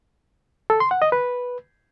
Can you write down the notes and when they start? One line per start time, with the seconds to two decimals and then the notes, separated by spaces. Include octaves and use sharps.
0.70 A4
0.80 C6
0.91 F#5
1.02 D#5
1.12 B4